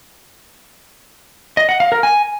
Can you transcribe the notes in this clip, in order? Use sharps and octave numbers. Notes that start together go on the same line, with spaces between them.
D#5
F#5
F5
A#4
G#5